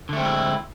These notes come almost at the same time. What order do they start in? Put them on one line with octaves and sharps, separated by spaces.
D3 A3 C4 G#3 E4